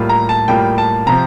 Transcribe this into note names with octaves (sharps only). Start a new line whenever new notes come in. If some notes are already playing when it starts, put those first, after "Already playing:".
Already playing: A2 G3 A#3 F4
A#5
A5
A2 G3 A#3 F4 G5
A5
C3 F3 C4 A#5